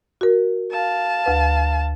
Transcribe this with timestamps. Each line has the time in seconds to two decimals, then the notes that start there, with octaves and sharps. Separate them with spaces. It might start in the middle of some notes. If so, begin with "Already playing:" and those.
0.21 F#4 A#4
0.71 F5 A5
1.26 D2 B4